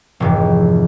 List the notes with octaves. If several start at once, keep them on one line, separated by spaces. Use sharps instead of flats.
F1 G#2 E3